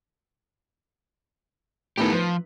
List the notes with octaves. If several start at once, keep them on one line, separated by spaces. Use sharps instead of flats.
A2 D#3 B3 G4 A4
F3 B4